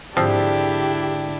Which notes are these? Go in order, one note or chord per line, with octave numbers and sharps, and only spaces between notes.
G#2 D3 F3 C4 D4 E4 G4